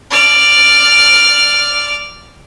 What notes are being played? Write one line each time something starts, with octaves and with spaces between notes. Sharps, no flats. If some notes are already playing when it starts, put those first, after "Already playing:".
D5 F6